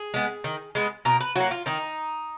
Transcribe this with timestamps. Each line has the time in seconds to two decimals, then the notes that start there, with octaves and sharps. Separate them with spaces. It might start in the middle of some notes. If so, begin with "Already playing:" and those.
Already playing: G#4
0.14 G#3 B3
0.44 D#3
0.75 G#3 B3
1.05 B2 A#4
1.21 B4
1.35 F#3 A#3 F#4
1.51 F4
1.66 D#3 D#4